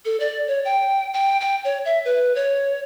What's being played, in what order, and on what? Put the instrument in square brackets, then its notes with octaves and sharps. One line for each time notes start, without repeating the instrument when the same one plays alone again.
[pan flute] A4
D5
C#5
G5
G5
G5
C#5
E5
B4
C#5